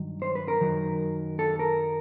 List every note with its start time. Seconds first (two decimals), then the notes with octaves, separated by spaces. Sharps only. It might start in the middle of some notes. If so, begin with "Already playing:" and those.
Already playing: G2 D#3 F#3
0.22 C5
0.35 B4
0.48 A#4
0.61 F#2 D#3 F#3
1.39 A4
1.59 A#4